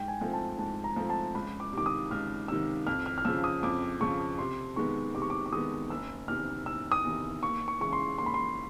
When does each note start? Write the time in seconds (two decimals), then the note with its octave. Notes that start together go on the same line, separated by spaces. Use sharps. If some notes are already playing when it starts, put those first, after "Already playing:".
Already playing: G#2 G5
0.08 G#5
0.21 F3 A3 C4
0.33 A5
0.58 G#2 A5
0.84 A#5
0.96 F3 A3 C4
1.10 A5
1.35 C#2 B5
1.60 D6
1.72 C3
1.78 D#3 D6
1.86 D#6
2.11 C#2 F6
2.48 C3 D#3 E6
2.87 F2 F6
3.06 F6
3.18 F6
3.25 C#3 F3 E6
3.44 D#6
3.63 F2 D6
4.00 C#3 F3 C#6
4.38 C3 C6
4.76 D#3 G#3 B3 C#6
5.14 C3 D6
5.22 C#6
5.30 D6
5.46 D6
5.52 D#3 G#3 B3 D#6
5.90 F#1 E6
6.28 E2 C3 D#3 F6
6.66 F#1 E6
6.92 D#6
7.04 E2 C3 D#3
7.42 D#2 C#6
7.68 C#6
7.80 C#3 E3 G#3 C#6
7.93 C6
8.18 D#2 C6
8.26 B5
8.34 C6